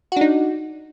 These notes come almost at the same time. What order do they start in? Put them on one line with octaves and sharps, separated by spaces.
F#4 D4 D#4